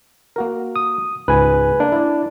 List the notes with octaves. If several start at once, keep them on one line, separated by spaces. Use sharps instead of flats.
A#3 F#4 A#4
D#6
C#2 G#2 B4 G#5
A#3 D4
E4 D5